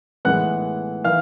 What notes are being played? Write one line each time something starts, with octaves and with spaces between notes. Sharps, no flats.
A2 E3 G#3 B3 F#5 F#6
E3 F5 F6